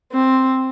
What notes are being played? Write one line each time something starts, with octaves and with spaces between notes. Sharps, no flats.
C4